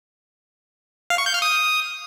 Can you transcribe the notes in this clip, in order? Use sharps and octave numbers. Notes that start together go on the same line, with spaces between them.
F5
C#6
G6
F6
D#6